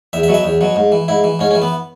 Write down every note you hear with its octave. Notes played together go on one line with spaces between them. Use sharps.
E2 E5
E5
B2 F#3
E5
E2
B2 F#3
G#2
E3
G#2 E4
E3
G#2 C#4
C#4
E3
B3